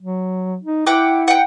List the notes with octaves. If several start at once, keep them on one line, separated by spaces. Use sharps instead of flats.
F#3
D#4
E4 F#5 G5 D6
F#5 G5